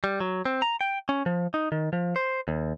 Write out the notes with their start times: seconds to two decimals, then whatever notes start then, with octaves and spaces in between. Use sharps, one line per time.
0.04 G3
0.20 F#3
0.45 C4
0.62 A#5
0.81 G5
1.09 C#4
1.26 F3
1.54 D#4
1.72 D#3
1.93 F3
2.16 C5
2.48 D#2